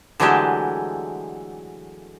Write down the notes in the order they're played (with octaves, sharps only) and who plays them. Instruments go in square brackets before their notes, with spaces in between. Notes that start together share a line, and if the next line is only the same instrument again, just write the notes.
[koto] D3 E3 F#3 G#3 A3 G4